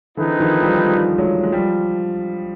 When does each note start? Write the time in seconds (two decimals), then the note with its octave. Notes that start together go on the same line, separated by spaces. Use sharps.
0.17 D3 E3 C4 D#4 G#4 B4
0.39 D#3 F3
0.62 F3 G3
0.85 F3 G3
1.18 F#3 G#3
1.43 G#3
1.52 F3 G3